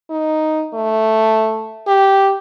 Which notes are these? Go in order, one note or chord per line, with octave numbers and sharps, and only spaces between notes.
D#4
A3
G4